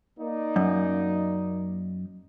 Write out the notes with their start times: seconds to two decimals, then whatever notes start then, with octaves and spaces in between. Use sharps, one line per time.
0.19 A#3 D#4 D5
0.56 F#2